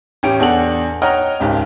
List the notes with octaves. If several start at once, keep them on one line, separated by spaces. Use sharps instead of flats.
A1 C#4 G4 D7
E2 D4 A4 F#5 F#7
C#5 D#5 F#5 G5 A#5 F6
G#1 C#2 G4